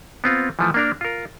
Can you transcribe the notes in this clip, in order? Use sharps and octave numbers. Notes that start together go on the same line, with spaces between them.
B3 C4 F4
E3 F3 A3
A#3 D4 A#4
F4 A#4